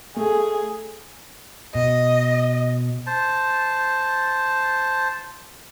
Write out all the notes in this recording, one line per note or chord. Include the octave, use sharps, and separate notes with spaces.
A3 G#4
B2 D#5
C5 A5